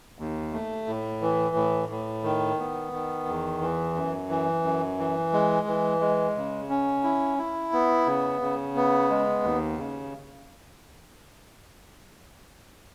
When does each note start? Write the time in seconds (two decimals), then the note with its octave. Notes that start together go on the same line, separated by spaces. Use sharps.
0.19 D#2
0.53 A3
0.87 A2
1.21 E3
1.56 A2
1.89 A2
2.24 D#3
2.59 B3
2.93 D#3
3.26 E2
3.61 E3
3.95 F#2
4.29 E3
4.63 F#2
4.99 E3
5.33 G#3
5.67 E3
6.01 G#3
6.36 C#3
6.70 C#4
7.04 E4
7.38 E4
7.73 B3
8.06 C#3
8.41 C#3
8.76 B3
9.10 G#3
9.43 D#2
9.78 C#3